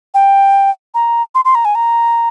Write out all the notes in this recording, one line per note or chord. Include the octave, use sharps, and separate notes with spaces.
G5
A#5
C6
C6
A#5
G#5
A#5